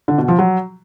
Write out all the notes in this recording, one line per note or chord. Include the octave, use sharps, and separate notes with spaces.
D3
B2
F3
F#3